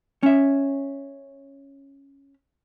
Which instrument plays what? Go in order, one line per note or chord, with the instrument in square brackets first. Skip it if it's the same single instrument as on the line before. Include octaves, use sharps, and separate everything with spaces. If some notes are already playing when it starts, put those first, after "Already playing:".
[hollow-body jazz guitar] C#4 E5